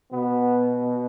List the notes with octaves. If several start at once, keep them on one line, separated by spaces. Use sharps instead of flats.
B2 B3